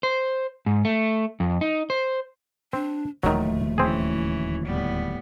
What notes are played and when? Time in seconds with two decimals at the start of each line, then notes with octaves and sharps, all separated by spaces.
0.03 C5
0.66 G#2
0.85 A3
1.40 F2
1.61 D#4
1.90 C5
2.73 C4 D4
3.23 D1 D#2 D#3 F3 F#3 A3
3.78 E3 C4 C#4 G#4
4.66 A2 G3 B3